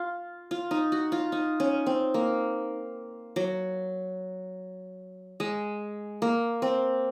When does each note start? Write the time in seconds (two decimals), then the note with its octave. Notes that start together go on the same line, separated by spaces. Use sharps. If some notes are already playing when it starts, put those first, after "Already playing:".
Already playing: F4
0.51 F4
0.71 D#4
0.92 F#4
1.12 F4
1.32 D#4
1.60 C#4
1.86 C4
2.14 A#3
3.36 F#3
5.40 G#3
6.22 A#3
6.62 C4